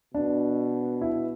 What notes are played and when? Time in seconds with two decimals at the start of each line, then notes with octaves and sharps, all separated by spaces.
0.14 B2 D4
1.01 E4